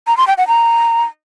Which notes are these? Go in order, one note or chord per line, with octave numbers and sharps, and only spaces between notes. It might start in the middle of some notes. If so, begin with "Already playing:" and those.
A#5
C6
G5
F#5
A#5